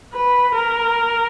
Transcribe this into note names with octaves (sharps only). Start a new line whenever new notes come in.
B4
A#4